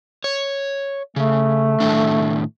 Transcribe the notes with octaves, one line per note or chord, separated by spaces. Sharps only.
C#5
C#3 A3
A2 D#3 D4